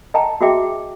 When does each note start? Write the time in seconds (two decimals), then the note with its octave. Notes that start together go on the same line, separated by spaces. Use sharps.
0.14 D#5 F#5 G5 A5 A#5
0.41 F#4 G#4 D#5 E5 G5 D6
0.64 G5